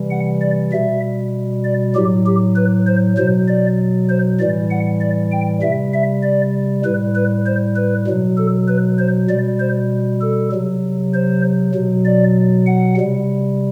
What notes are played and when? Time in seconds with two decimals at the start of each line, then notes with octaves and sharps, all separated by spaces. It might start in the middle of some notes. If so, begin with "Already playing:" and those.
Already playing: C3 E3 G3
0.11 F#5
0.42 D5
0.72 B2 G3 E5
1.65 D5
1.95 A2 F#3 G4
2.26 G4
2.56 B4
2.87 C5
3.17 B2 F#3 C5
3.48 D5
4.09 C5
4.40 A2 E3 G3 D5
4.71 F#5
5.01 D5
5.32 G5
5.62 C3 G3 E5
5.94 E5
6.23 D5
6.85 A2 G3 B4
7.15 B4
7.46 C5
7.76 B4
8.07 B2 F#3
8.38 A4
8.68 B4
8.98 C5
9.29 B2 G3 D5
9.60 C5
10.22 A4
10.52 C3 F#3
11.14 C5
11.75 B2 F#3
12.06 D5
12.67 F#5
12.97 C3 G3